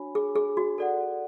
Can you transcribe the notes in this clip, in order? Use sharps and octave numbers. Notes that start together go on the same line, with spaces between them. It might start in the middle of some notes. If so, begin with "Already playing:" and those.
Already playing: D4 F#4 C#5 G#5 B5
G#4
G#4
F#4
A4 D5 F#5